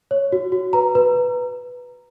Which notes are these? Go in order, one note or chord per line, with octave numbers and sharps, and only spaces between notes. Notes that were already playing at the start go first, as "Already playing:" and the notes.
C#5
F#4
F#4
B4 A#5
B4